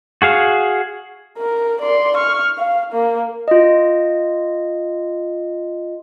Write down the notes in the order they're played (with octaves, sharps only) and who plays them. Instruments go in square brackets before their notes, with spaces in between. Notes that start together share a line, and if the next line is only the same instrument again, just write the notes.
[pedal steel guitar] F#4 G#4 F5
[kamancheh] A#4
D5 C6
C#6 F6
F5
A#3
[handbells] F4 D#5